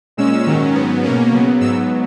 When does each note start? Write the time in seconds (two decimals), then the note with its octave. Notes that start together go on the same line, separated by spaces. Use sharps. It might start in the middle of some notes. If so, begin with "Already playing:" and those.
0.17 A#2 G#3 C#4 E6
0.46 G#2 D#3 F#3 C#4
0.75 G#2 F#3 B3
1.03 B2 A#3 C#4
1.32 C#3 F#3 B3
1.60 G#2 F#3 B3 E6